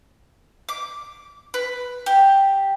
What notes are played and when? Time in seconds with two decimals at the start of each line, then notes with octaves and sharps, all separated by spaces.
0.69 D6
1.54 B4
2.06 G4